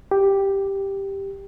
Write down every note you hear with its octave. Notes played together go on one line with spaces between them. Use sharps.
G4